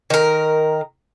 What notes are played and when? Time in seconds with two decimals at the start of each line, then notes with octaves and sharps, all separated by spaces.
0.10 D#3 A#4